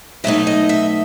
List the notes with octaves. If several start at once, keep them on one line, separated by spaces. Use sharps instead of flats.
B2 F#3 A3 D#4 E5
D#5
E5